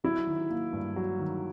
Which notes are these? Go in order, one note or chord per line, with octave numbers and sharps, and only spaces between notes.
F#3 E4
D#3
A#3
G2
F#3
D#3